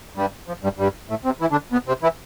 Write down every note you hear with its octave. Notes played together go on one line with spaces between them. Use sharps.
G2 G3
F3
G2 G3
G2 G3
A2 A3
C3 C4
E3 E4
D3 D4
B2 B3
C3 C4
E3 E4